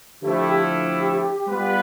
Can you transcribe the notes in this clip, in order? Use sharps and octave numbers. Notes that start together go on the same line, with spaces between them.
D3 F3 A3 E4 G4
G4
G3 B3 F4 B4